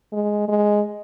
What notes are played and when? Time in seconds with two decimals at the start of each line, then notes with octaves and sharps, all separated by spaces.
0.13 G#3
0.49 G#3